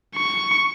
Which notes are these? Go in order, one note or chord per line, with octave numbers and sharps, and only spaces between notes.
C#6